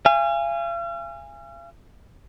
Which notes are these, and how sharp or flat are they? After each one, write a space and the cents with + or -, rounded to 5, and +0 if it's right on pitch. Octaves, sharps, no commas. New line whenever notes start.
F5 -40 G#5 -20